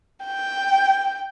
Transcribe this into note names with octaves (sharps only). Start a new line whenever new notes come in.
G5